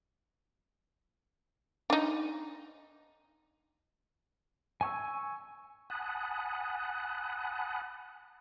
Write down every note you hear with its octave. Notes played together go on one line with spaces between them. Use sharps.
D4 D#4
G#5 C#6 E6
F#5 G#5 A5 B5 D#6 F#6